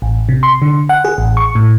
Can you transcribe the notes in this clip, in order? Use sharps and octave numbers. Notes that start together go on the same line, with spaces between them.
A1
C3
C6
D3
F#5
G#4
A1
C#6
A2